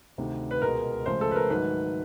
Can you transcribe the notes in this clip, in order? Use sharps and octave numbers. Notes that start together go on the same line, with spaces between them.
D2 C3 D#3
B4
C#2 B2 G#3 A#4
C#2 C#3 F3 A3 C5
A4
B4
A#4
G#2 D#3 F#3 A3 B4